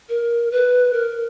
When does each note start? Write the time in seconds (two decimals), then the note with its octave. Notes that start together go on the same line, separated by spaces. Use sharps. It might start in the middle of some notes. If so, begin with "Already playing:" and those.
0.09 A#4
0.51 B4
0.93 A#4